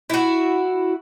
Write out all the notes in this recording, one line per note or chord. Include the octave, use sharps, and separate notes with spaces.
E4 F#4